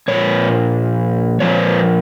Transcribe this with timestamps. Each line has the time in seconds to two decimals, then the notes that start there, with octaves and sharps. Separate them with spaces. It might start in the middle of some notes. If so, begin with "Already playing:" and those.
0.08 A#2 F3 C#5
1.40 A#2 F3 C#5